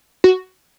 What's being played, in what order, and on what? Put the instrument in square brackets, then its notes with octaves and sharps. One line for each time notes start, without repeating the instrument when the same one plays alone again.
[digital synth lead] F#4